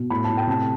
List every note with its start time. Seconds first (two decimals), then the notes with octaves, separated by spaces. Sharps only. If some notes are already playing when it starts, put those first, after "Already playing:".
Already playing: B2
0.10 A2 B5
0.24 A2 A5
0.37 G5
0.47 C3 A5